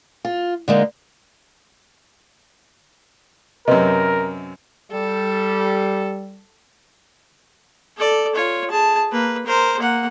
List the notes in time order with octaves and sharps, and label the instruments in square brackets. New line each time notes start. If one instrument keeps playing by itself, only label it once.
[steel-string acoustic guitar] F4
D3 G#3 A#3 D#4
[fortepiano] F#2 C3 [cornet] A#4 [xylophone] B4 D#5
[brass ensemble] G3 [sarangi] A4
[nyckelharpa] A4 D5
F4 C#5
G#4 A5
A#3 B4
A#4 C5
A#3 F#5